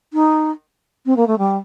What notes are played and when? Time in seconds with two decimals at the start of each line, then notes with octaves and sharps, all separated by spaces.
0.13 D#4
1.06 C4
1.16 A#3
1.27 A3
1.38 G3